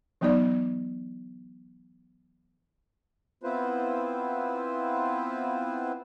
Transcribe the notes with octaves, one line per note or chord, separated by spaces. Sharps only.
E3 F#3 B3 D#4 D5
B3 C4 E4 F4 B4 C5